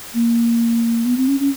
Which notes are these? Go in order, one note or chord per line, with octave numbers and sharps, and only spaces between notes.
A#3
B3
C4
C#4
C#4